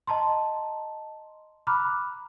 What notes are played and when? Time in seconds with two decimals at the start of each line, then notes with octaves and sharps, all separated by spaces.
0.07 D#5 A5 A#5 C6
1.67 A#5 B5 D6 F6 F#6